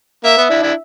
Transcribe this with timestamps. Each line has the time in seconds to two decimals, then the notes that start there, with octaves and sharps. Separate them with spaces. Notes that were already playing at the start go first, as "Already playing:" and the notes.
0.24 A#3 E5
0.37 B3
0.50 D4 E4
0.63 D4 E4